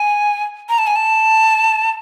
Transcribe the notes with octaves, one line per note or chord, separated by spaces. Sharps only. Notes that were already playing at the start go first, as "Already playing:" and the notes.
Already playing: G#5
A#5
A5
G#5
A5